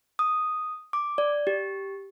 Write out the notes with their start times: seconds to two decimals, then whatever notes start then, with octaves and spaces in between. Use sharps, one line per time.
0.19 D#6
0.93 D6
1.18 D5
1.47 G4